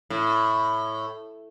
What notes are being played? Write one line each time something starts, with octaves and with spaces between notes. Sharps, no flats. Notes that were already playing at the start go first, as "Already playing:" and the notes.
A2